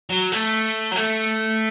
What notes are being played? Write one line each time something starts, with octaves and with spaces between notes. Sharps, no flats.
F#3
A3
F#3
A3